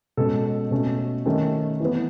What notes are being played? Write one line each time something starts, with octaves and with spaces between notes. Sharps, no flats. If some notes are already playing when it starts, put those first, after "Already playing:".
B2 G#3 C#4 A4
B2 A3 C#4
D#3 A3 C#4
E3 B3